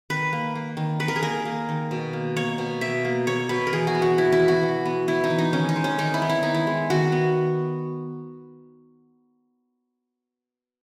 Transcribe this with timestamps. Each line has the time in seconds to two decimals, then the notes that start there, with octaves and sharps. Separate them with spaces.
0.10 D#3 B4
0.33 A#3
0.55 A#3
0.77 D#3
1.00 D#3 B4
1.08 A#4
1.16 G#4
1.23 A#3 A#4
1.45 A#3
1.69 D#3
1.91 B2
2.13 A#3
2.36 A#3 C#5
2.58 B2
2.81 B2 E5
3.05 A#3
3.27 A#3 C#5
3.49 B2 B4
3.67 A#4
3.73 E3 G#4
3.87 F#4
3.95 B3
4.02 F#4
4.18 B3 E4
4.32 E4
4.40 E3
4.48 F#4
4.63 E3
4.86 B3
5.08 B3 E4
5.24 D#4
5.30 E3
5.38 D#4
5.53 D#3 C#4
5.69 D#4
5.76 G#3
5.84 C#4
5.98 D#3 D#4
6.14 E4
6.22 B3
6.29 E4
6.43 D#3 D#4
6.54 E4
6.67 G#3
6.90 D#3 F#4
7.12 B3